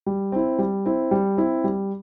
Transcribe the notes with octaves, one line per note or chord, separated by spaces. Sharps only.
G3
C4 E4
G3
C4 E4
G3
C4 E4
G3